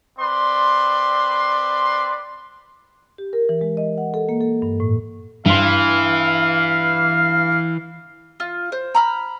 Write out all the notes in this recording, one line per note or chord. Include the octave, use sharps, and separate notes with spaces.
C4 B4 D5 C6
G4
A#4
E3
G#3
D#5
F#5
A4
A#3
A4
G2
A2
G2 E3 F5 C6
F4
C5
A#5 B5 F6